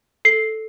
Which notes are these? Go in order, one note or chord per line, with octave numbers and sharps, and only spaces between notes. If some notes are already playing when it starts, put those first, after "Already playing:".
A4 C7